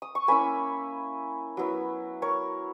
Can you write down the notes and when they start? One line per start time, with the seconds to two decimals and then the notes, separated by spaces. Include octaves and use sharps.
0.02 D#6
0.15 C#6
0.28 A#3 C#4 E4 G#5 B5
1.57 F#3 B3 E4
2.22 A#4 C#5